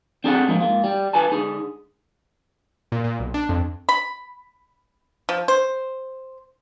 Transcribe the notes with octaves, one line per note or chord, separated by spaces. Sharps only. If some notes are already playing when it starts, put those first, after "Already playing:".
C4 D4 G#4 A4 D5 F#5
G#2 F3 G#3 A#3
G#2 A#3 F4
G3
F4 B4 G#5 A5
D3 D#4 G#4
A#2
A#2
B1
D4
F2
B5
F3
C5